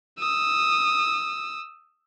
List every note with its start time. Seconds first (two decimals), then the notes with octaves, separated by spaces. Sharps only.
0.19 D#6 E6